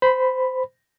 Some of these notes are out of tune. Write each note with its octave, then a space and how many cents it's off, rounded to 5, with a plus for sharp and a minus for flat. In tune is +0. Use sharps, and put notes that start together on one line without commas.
C5 -20 B5 +0